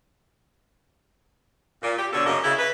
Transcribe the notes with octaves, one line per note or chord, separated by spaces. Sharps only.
A#2
G4
B2 D3 A4 C#5
F#2 C#3 A#3 D#5
C#3 E4
B4